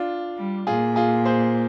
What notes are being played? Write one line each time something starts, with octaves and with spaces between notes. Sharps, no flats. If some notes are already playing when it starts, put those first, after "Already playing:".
Already playing: D4 F4
G3
A#2 F4 G#4
F4 G#4
G#4 C5